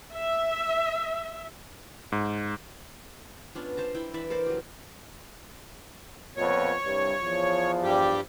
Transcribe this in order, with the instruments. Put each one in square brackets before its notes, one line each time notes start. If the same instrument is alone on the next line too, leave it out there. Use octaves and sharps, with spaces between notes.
[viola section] E5
[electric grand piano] G#2
[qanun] B3 C#4 D4 F4
C5 A5 A#5
E4 G5
E3 B4 D5 E5
A4 A#4 C5 D5
F#3 G4
[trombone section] F2 A#2 B3 [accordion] C#5
[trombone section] C2 G2
E2 F3
[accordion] G2 G3 G4